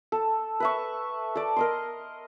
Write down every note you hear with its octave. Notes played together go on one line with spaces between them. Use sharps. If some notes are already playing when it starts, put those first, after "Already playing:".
A4
B4 E5 C#6
A4 D5
A#4 D#5 C6